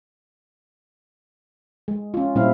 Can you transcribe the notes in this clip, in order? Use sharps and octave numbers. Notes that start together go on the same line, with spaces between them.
G#3
C#4 F4
A#2 G3 C4 E4 F5